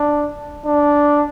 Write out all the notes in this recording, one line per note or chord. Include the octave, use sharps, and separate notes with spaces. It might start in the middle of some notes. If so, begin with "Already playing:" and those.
Already playing: D4
D4